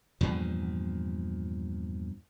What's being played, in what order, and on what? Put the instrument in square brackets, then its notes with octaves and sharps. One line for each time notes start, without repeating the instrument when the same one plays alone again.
[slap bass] E2 G2 A#2 F3